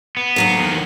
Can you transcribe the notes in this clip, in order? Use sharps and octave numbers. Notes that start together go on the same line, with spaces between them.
B3
D2 F#3 A#3
E2 D#3